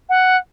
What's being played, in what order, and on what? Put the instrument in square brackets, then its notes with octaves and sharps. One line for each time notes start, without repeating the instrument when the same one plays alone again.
[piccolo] F#5